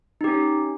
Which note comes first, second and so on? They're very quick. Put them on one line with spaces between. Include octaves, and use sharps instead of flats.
D#4 G4 C#4